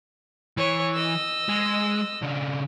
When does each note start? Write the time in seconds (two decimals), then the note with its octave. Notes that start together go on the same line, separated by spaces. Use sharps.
0.57 E3 C#5
0.95 D#5 E6
1.48 G#3
2.22 C#3 D4